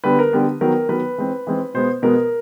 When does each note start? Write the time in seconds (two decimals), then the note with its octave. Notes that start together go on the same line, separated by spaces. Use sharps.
0.04 D3 G3 B3 B4
0.19 A#4
0.33 D3 G3 B3
0.61 D#3 F#3 B3 A#4
0.89 D#3 F#3 B3 B4
1.18 E3 G#3 C4
1.47 E3 G#3 C4
1.74 B2 G#3 B3 C5
2.02 B2 G#3 B3 A#4